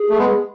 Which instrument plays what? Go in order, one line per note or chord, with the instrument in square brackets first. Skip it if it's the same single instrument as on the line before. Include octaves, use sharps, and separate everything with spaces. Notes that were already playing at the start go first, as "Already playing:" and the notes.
Already playing: [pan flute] G#4
[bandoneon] A3
G#3 B3